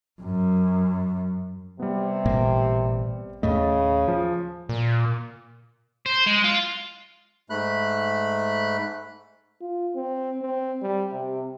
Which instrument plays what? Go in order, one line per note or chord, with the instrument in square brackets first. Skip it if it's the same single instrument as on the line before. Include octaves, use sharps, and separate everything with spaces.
[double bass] F#2
[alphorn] C3 [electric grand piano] G3 B3
[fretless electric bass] A1 A#2 A#3
[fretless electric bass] D#2 A2 A3 [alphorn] C#3 [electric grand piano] D#5
[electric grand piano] F3
[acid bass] A#2
[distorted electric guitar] C5
G#3
F4
[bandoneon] G#2 A3 B5 F#6
[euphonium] F4
C4
C4
G3
C3